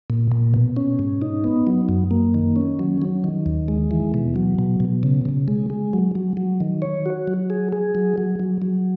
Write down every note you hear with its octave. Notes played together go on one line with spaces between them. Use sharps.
A#2
A#2
B2
C#4
G#2
D#4
B3
F#3
F#2
A#3
D#3
C#4
F#3
F#3
D#3
D#2
G#3
E3
B2
F#3
B2
B2
C#3
C#3
G#3
G#3
F#3
F#3
F#3
D#3
C#5
F#4
F#3
G#4
G#4
F#3
F#3
F#3
F#3